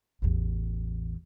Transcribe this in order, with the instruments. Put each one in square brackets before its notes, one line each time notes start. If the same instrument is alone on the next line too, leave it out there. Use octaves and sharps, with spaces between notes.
[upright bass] A1 E2